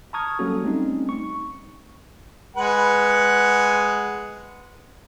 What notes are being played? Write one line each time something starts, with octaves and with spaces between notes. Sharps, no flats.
A5 A#5 C#6 D#6 F6 G#6
F#3 G3 A#3 C#4 F#4 A4
G3 A3 C4 C#4 D#4
C#6
G#3 B4 F#5